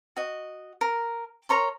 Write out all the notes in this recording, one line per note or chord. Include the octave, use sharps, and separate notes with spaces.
F#4 D#5
A#4
A#4 C#5 A#5 C6